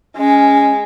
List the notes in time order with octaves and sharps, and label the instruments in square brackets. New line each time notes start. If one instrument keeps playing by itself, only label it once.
[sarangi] G#3 [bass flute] C#4